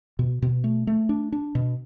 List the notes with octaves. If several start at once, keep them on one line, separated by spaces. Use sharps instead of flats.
B2
B2
A3
A3
D4
D4
B2